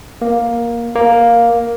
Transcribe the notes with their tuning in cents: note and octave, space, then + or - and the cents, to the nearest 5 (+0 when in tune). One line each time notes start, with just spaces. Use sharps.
A#3 +10
A#3 +5